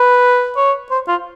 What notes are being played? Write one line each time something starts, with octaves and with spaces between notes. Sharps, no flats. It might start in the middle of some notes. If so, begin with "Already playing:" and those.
Already playing: B4
C#5
C5
F4